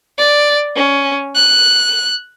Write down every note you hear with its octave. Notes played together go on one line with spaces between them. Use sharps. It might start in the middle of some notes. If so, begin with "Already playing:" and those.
D5
C#4
F#6